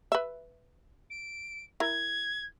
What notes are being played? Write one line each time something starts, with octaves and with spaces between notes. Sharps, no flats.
B4 E5
D7
E4 A#4 G#6